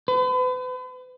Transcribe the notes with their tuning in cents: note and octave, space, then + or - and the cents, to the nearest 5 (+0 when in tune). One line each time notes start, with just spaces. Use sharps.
B4 +40